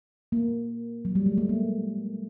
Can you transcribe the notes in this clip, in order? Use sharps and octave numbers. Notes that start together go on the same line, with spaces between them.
A#3
F#3
G3
G#3
A3
A#3